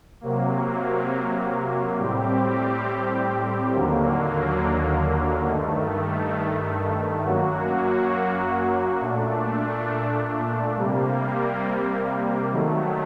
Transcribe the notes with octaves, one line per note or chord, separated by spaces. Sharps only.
C3 F#3 A#3
A2 G3 C4 G4
D#2 D3 F#3 A#3
G2 D#3 A3
F#2 F#3 A#3 F#4
A#2 A3 D4
C3 G3 A#3
D#3 F#3 A3